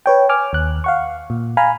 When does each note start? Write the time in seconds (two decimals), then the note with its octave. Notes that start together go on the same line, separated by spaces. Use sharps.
0.06 B4 C#5 G5
0.29 G#5 D6 F6
0.53 D#2 F#6
0.84 F5 F#5 C#6
1.30 A#2
1.57 F5 G#5 A#5 B5 F6